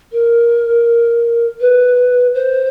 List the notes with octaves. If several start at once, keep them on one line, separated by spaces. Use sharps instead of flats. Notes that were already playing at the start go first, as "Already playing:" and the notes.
A#4
B4
C5